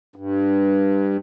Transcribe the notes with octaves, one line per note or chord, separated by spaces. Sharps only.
G2